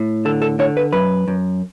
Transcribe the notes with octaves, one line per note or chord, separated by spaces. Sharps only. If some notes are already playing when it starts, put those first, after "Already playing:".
Already playing: A2
D3 A4
A4
D3 C#5
B4
F#2 B4
F#2